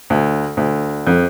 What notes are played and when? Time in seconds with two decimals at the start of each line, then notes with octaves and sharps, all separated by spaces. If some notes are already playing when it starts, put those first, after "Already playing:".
0.10 D2
0.57 D2
1.07 F2